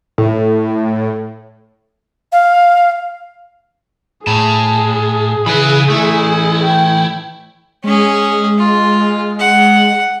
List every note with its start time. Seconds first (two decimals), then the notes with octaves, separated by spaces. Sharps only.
0.18 A2
2.32 F5
4.27 A2 G#4 A5 B5
5.46 C#3 E3 B4 B5
5.90 E3 A3 E4
6.63 G5
7.84 G#3 C#4 G#4
8.58 F4
9.39 F#5